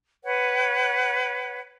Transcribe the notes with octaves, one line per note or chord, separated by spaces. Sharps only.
B4 C#5 F#5